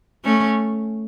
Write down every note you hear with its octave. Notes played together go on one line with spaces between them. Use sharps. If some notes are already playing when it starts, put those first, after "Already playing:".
A3 C#4